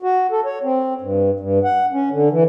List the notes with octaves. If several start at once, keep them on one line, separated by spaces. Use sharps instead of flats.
F#4
A4
C#5
C4
G2
G2
F#5
C#4
D3
E3